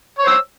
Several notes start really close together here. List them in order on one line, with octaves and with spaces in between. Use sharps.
C#5 C5 E6